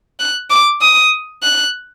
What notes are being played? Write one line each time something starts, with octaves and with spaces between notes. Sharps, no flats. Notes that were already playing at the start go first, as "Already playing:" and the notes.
F#6
D6
D#6
F#6